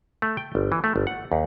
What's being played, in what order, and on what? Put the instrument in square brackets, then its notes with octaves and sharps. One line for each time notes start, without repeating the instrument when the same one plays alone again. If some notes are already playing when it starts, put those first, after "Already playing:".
[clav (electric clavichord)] A3
G5
G1
E3
A3
G1
F#5
D#2